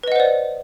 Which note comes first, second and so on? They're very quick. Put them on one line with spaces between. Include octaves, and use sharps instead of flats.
B4 D#5 F#5 C5 D5